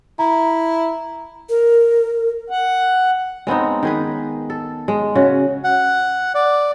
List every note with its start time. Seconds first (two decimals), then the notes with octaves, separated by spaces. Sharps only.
0.19 E4 A#5
1.50 A#4
2.50 F#5
3.47 G#3 B3 C4 D#4
3.83 D#3 G#4 B4
4.50 A4
4.88 G#3
5.15 C#3 F#4
5.64 F#5
6.35 D5